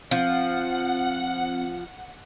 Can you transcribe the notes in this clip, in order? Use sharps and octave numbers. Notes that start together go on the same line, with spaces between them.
F3 C4 F#5